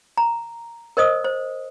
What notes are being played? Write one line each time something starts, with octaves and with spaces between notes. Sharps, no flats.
A#5
A#4 C5 D#5 D#6
C5